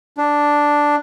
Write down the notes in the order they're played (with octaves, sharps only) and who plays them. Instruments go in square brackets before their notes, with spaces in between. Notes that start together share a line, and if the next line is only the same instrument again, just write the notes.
[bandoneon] D4